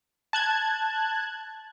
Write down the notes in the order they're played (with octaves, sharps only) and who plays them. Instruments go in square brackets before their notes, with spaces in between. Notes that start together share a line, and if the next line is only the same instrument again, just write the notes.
[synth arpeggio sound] A5 F#6 G#6